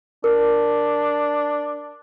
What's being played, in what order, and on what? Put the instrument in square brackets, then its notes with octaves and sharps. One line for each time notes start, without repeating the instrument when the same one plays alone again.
[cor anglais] D4 [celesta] A#4